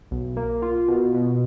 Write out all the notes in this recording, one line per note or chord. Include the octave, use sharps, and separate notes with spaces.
B1
A#3
F4
B2
B2